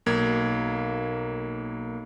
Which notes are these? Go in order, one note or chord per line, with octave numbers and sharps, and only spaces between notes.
B1 A#3 G#6